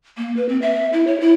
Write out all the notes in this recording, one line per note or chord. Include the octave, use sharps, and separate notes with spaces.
A#3
B4
C4
E5
E4
C#5
E4